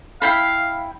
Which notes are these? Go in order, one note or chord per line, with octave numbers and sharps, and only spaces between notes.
E4 F5 G5 B5